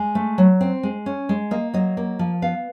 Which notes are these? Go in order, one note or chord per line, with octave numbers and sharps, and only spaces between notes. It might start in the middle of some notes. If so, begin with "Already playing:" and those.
Already playing: G#3 G#5
A3
F#3
C4
G#3
C#4
G#3
A#3 D#5
F#3 D#5
A#3
F3
B3 F5